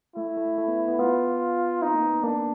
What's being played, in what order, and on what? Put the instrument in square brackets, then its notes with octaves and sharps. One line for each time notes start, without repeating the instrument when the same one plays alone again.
[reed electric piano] A3 [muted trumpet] E4
[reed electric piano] A3
A3
B3
B3
[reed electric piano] B3 [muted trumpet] F4
[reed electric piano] C4 [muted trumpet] D#4
[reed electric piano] A#3
B3
[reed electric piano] A#3 [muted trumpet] D4